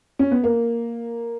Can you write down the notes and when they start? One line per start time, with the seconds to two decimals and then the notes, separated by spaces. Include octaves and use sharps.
0.19 C#4
0.31 B3
0.44 A#3